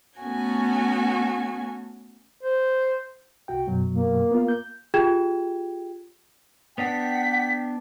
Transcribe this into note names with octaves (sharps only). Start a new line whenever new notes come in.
A3 B3 C#4 F#4 G#5
C5
C2 F#4 G5
F#2 B2 F#3
A#3
B3 F4
G6
F4 G4 G#4 G5 G#6 E7
B3 D4 F#5 G5 B6